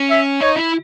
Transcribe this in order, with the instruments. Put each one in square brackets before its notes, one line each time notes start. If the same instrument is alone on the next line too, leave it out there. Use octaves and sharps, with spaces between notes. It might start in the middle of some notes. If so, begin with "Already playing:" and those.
Already playing: [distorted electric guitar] C#4
[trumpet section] E5
[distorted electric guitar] D#4 [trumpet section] C#5
[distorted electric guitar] E4